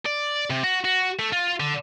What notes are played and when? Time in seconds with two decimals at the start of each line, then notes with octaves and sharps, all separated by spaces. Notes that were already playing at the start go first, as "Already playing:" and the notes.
0.06 D5
0.50 C3
0.64 F#4
0.85 F#4
1.19 A3
1.33 F4
1.60 D3